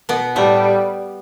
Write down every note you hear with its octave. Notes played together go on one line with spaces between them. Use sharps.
B2 B3
A2 G3 A3